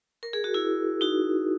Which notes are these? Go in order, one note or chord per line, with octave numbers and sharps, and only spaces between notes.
A#4
G#4
F#4
E4 G#4
D#4 F#4